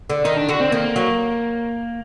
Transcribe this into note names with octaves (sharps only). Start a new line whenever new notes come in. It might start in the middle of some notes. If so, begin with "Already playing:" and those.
D3
D#3 D#4
D4
D3 F#4
C4
D#3 A#3
F#3